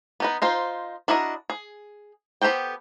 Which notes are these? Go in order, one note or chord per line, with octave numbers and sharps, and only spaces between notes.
B3 D#4 B4
D#4 F4 C5
D4 E4 F#4 A#4 D#5
G#4
B3 G4 A4 C5 G5